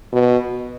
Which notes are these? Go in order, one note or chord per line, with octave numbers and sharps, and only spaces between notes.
B2